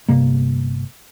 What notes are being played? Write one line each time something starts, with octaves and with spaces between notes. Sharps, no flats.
G1 C3 A#3